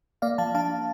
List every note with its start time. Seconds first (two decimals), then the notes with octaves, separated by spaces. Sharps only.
0.22 A#3 D5 F5
0.38 F3 F5 A5
0.55 D4 F5 A5